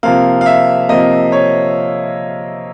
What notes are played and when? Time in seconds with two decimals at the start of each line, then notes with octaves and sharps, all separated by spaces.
0.03 C3 F3 A#3 F5
0.41 F5
0.46 E5
0.89 C3 F3 A#3 D#5
1.32 C#5